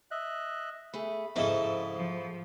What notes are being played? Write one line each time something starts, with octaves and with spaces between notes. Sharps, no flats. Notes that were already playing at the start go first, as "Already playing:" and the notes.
D#5 E5 F#6
A3 G#4 B5
F2 G#2 C#3 E4 A4 D#5
F3